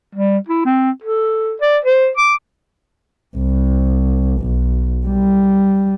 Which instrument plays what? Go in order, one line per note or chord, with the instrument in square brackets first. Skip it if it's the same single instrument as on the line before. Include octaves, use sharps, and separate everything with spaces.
[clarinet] G3
E4
C4
A4
D5
C5
D6
[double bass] C2
B1
G3